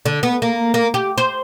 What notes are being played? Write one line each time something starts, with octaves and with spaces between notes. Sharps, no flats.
D3
B3
A#3
A#3
G4
C5